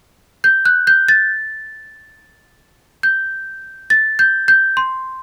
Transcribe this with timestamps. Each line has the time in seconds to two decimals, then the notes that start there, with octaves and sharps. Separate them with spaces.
0.44 G6
0.65 F#6
0.87 G6
1.08 A6
3.03 G6
3.90 A6
4.19 G6
4.48 G6
4.77 C6